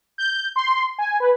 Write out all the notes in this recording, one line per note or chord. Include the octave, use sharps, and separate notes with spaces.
G6
C6
G#5
B4